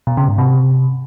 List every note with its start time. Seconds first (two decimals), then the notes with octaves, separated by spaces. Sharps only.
0.07 B2
0.17 C#3
0.28 G#2
0.38 C3